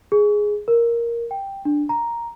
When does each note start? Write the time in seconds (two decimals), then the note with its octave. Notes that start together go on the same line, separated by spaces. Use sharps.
0.12 G#4
0.68 A#4
1.31 G5
1.65 D4
1.89 A#5